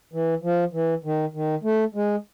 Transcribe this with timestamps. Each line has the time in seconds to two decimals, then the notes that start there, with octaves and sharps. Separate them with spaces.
0.13 E3
0.43 F3
0.73 E3
1.04 D#3
1.34 D#3
1.63 A3
1.95 G#3